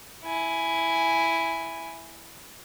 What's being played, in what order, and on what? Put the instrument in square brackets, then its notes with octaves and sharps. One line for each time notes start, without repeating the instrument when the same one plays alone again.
[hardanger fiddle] E4 G#5